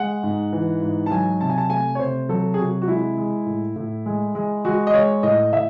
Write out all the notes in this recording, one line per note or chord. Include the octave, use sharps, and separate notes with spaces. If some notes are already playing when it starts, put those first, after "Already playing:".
Already playing: G#3 F#5
G#2
E3
G#2
A5
F#3 G#5
C3 A5
G#5
A5
A3 G#5
C#5
C3 C5
F#3 A4
G#4
C3 F#4
F#4
G#3 E4
G#3
A2
A2
G#3
G#3
G#3 F#4
D#5
G#3 C#5
A2 D#5
A2 E5